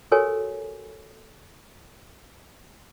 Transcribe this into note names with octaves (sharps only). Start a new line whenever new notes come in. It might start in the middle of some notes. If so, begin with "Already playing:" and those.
F#4 G4 A4 A#4 C#5 G#5